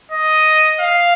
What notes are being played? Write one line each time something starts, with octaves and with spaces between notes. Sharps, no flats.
D#5
F5